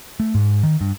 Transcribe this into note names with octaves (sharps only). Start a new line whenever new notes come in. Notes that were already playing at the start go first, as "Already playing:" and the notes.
A3
G#2
D#3
G2